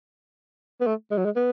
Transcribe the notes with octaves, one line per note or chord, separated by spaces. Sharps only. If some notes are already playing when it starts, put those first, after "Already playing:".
B3
A3
G#3
F#3
G#3
B3